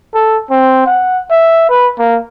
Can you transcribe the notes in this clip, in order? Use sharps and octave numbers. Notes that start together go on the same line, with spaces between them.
A4
C4
F#5
E5
B4
A#3